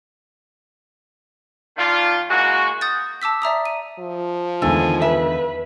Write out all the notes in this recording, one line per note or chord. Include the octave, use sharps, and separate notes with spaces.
D#3 A#3 D4 F4
E3 G#3 A#3 F#4
D#6 G6 A6
A5 D6 E6 B6
D5 E5 A#5 D#6
D#7
F3
E2 D3 D#3 G#3 A3 G#5
B4 E5